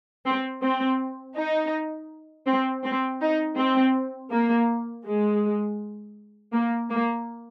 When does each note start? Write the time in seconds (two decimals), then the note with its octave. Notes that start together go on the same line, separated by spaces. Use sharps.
0.25 C4
0.62 C4
1.37 D#4
2.47 C4
2.85 C4
3.21 D#4
3.58 C4
4.32 A#3
5.06 G#3
6.53 A#3
6.90 A#3